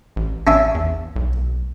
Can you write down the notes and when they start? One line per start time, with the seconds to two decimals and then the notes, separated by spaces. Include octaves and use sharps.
0.16 A1
0.47 A1 C#4 D4 E5
0.75 E2
1.16 B1